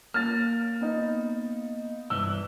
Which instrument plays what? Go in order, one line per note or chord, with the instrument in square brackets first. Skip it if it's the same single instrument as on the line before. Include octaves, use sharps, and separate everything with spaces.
[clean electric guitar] A#3 [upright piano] F6 A6
[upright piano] B3 D#4
[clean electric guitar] C2 G2 E3 [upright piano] E6